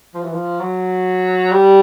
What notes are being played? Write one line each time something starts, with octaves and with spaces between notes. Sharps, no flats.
F3
E3
F3
F#3
G3